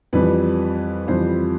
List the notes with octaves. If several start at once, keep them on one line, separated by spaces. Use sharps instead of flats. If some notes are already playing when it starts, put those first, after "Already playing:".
F2 E3 G3 B4
F2 E3 G3 C5